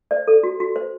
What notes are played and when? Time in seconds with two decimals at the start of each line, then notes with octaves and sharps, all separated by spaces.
0.11 C5 D5
0.28 A4
0.43 F#4
0.60 F#4
0.76 C5